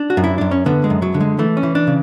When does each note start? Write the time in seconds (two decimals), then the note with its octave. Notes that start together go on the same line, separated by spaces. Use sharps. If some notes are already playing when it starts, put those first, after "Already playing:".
Already playing: D4
0.10 F#4
0.17 F#2
0.24 E4
0.38 F#2 D4
0.51 C#4
0.66 D3 B3
0.84 G#3
0.90 F#2
1.02 F#3
1.14 D3
1.21 G#3
1.39 E3 A3
1.57 C#4
1.63 E3
1.75 D4
1.87 C#3